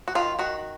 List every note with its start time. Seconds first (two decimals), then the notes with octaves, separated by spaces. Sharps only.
0.08 F#4
0.15 D#3 F4
0.39 D#3 F#4